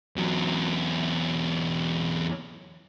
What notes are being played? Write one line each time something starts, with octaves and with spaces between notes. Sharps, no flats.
E2 F#3